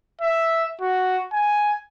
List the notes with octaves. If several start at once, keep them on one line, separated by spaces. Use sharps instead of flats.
E5
F#4
G#5